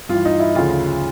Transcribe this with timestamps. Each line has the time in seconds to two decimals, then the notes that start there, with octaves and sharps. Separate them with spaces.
0.09 G2 E3 F4
0.25 D#4
0.40 E4
0.55 D2 C#3 F3 F4